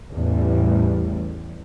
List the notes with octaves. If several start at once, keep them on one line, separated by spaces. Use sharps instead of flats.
A1 E2 A2 G3